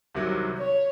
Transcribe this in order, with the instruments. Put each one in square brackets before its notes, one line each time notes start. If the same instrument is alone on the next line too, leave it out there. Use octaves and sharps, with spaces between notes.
[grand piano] C2 C3 D#3 F#3
[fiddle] C#5